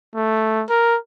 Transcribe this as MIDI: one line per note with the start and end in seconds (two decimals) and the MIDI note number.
0.15 0.64 57
0.70 0.97 70